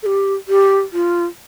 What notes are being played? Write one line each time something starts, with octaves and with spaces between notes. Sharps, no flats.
A4
G4
G4
F4